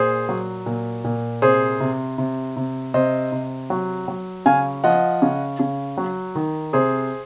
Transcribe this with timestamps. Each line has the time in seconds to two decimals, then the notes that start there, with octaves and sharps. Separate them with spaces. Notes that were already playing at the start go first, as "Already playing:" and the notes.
Already playing: A#2 G#4 C5
0.29 F#3
0.66 A#2
1.04 A#2
1.42 C3 G#4 C5
1.80 C3
2.18 C3
2.56 C3
2.94 C3 C5 D#5
3.32 C3
3.70 F#3
4.08 F#3
4.46 C#3 F5 G#5
4.84 F3 D#5 F#5
5.22 C#3
5.59 C#3
5.97 F#3
6.35 D#3
6.73 C3 G#4 C5